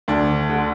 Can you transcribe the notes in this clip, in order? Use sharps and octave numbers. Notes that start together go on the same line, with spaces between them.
D2 D4
D3